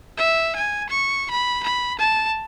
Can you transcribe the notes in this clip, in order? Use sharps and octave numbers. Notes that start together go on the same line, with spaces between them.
E5
G#5
C#6
B5
B5
A5